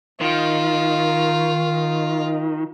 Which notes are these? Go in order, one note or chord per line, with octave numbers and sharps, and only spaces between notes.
D#3 F4